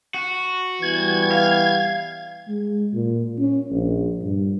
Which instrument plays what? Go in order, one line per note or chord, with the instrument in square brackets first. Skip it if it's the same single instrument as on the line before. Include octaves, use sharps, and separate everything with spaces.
[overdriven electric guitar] F#4
[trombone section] E3 G3 B3 [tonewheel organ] G#6
[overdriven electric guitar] F5
[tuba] G#3
A#2
C#4
A#1
G2